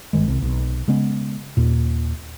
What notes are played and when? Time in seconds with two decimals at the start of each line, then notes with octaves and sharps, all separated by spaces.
0.13 G1 D#3 G#3
0.28 C2 C3
0.42 B1
0.88 C#3 G#3 B3 C#4
1.57 D#2 A#2